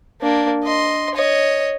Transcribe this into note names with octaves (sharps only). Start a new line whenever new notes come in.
A#3 D4
D#5 C6
C#5 D#5